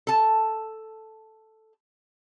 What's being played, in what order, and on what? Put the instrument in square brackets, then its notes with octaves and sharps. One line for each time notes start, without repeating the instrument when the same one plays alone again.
[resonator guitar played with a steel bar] A4 A5